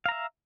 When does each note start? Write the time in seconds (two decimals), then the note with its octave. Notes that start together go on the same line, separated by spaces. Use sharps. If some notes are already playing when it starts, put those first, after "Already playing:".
0.06 F5
0.09 A#5
0.12 E5